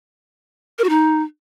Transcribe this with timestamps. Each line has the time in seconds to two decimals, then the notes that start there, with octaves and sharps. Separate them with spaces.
0.79 A#4
0.84 F#4
0.89 D#4